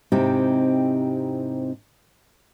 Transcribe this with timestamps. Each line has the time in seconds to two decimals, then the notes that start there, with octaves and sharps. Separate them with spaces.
0.12 G#2 C3 C4 D#4 E4 G4